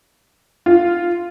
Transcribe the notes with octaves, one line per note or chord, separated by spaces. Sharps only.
F4